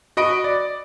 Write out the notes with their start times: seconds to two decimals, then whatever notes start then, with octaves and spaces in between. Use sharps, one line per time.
0.17 F#4 D#5 B5 D7
0.44 D5